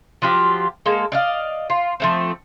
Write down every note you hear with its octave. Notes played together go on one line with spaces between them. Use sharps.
F3 F#3 F4 G4
G#3 A#3 A4
D5 D#5 F5
F4
F3 A3 C4